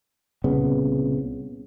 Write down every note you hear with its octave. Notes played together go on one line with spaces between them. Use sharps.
C2 A#2 C#3 B3